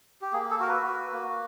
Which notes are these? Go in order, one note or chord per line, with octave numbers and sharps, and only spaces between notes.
G4
A#3 G#4
A4
F#4 A#4
B4
F#4
A#3